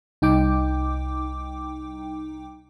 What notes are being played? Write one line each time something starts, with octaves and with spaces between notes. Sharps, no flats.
C2 D#4 G5 D6